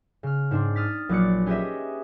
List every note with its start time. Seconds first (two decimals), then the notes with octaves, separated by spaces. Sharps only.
0.23 C#3 F6
0.51 G#2 C4 D4
0.75 D#6 F6 A6 B6
1.09 A#1 F#3 D5 D6 F#6 C#7
1.46 C#4 G4 G#4 B4 D#5 E5